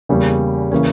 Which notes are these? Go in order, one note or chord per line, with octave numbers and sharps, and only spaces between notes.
E2 C#3 G3 A#3 C#4
C#3 E3 A#3 C#4